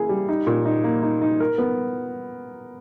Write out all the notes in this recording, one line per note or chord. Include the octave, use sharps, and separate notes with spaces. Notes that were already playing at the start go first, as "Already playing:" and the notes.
Already playing: A#3 E4 G#4
G3
D#4
A#2
D#4
A#3
D#4
D#4
A#4
B3